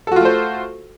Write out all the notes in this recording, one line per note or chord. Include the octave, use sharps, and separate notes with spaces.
A3 F4 F#4 A4 C5